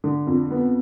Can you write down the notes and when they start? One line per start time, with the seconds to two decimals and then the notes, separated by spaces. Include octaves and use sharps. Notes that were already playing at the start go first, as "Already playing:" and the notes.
0.04 D3
0.27 F2
0.51 B3